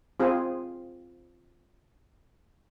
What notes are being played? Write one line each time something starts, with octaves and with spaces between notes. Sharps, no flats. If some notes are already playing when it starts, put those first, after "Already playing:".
C4 F4 G#4